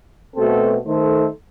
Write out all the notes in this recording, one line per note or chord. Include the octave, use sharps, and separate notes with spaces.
B2 A3 C4 F#4 A4
D#3 A3 D#4 A4 C5